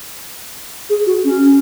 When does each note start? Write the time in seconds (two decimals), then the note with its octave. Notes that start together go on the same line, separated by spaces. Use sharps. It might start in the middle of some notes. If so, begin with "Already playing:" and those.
0.90 G#4
1.07 F#4
1.25 C#4